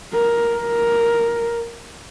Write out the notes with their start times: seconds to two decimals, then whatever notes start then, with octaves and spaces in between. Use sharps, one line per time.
0.13 A#4
0.56 A#4